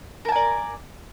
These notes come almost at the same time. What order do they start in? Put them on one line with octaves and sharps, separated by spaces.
A#4 A5 G#5 D5